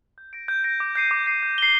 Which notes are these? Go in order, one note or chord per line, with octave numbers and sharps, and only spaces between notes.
G6
A#6 D7
G6
A#6 D7
D6
G6 C7 D#7
D6
G6 C7 D#7
G6
C7 G7